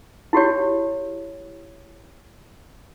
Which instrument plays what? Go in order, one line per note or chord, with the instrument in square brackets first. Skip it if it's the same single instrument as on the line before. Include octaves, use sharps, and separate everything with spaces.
[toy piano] E4 F#4 G4 C#5